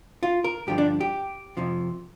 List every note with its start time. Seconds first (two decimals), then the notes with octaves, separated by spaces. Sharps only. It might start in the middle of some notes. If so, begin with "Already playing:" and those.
0.23 F4
0.44 A#4
0.67 G2 D3 F3 G4
0.78 D4
1.01 G4
1.57 F2 C3 F3